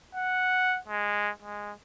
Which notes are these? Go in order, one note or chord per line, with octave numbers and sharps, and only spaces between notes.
F#5
G#3
G#3